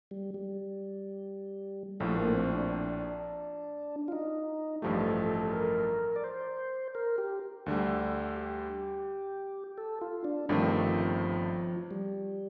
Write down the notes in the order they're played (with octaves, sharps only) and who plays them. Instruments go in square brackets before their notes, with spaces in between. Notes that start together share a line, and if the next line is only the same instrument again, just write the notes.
[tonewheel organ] G3
G3
[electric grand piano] A#1 A2 F3 [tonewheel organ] A3
[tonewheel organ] A#3
C4
D4
F4
D#4
[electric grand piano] A1 G2 F3 A3 [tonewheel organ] G4
[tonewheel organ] A4
A4
A4
A#4
D5
C5
A#4
G4
[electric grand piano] D2 D3 G3
[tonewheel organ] G4
A4
F4
D4
[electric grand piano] G1 G2 D#3 A3 C4 [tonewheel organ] F3
[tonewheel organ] G3